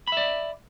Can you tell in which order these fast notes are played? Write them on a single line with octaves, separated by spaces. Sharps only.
B5 E5 D5